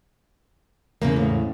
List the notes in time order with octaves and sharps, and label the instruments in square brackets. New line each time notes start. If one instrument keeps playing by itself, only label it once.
[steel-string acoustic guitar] E2 G#2 C#3 [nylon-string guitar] A#3
[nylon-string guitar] A2